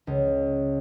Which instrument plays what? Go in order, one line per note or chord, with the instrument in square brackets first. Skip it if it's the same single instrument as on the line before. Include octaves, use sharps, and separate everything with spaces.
[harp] C#2